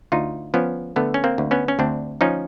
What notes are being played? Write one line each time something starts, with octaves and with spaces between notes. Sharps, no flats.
D2 D#4 F4
F3 B3 C#4
D3 A3 B3
C#4
A#3 C4
D2
B3 C#4
C#4
D2 C4 D4
F3 C#4 D#4